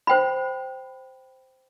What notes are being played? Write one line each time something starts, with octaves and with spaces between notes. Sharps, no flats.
C5 G5 B5